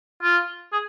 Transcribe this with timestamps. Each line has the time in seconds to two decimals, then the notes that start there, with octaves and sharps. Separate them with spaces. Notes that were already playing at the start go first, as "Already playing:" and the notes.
0.23 F4
0.73 G#4